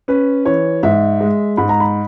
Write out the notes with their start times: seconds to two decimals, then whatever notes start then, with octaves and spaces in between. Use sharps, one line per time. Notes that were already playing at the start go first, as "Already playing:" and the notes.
0.08 C#4 B4
0.45 E3 C#5
0.83 G#2 E5
1.21 G#3
1.57 G#2 B5
1.69 A#5
1.80 B5